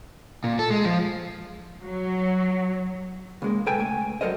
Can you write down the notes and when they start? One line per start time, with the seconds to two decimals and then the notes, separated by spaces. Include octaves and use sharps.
0.44 A#2
0.59 A4
0.70 G#3
0.85 F3
1.83 F#3
3.42 C#2 G#3 A#3
3.66 B1 B2 A4 B4 G5 G#5
3.79 C#2 A3 G#5
4.21 G2 F#3 A4 A#4 C5 D#5